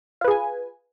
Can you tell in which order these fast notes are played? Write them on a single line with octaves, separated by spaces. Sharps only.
F4 B4 G#4 G#5